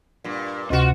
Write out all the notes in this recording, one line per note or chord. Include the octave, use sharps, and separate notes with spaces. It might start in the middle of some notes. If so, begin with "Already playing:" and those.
G2 A#2
D2 C3 F4 F#4